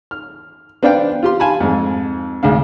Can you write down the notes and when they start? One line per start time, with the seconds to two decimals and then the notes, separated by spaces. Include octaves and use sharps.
0.11 F6
0.83 B3 D4 C5 D5 F5 G5
1.23 F4 G4 C6
1.40 F5 G#5 A5 B5
1.60 F2 G#2
2.43 G#1 D2 G#3 D4 F5